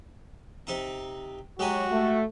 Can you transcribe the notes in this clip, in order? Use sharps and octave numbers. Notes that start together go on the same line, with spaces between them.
C3 D#4 A#5
F#3 G#3 F#4 G4 G#5
A3